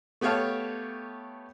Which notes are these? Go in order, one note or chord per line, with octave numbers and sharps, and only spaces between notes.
A3 B3 G4 C#5 F5 A5